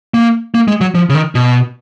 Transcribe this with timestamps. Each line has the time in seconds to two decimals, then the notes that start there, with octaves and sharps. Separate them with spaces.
0.14 A#3
0.54 A#3
0.68 G#3
0.81 F#3
0.95 F3
1.09 C#3
1.15 D#3
1.35 B2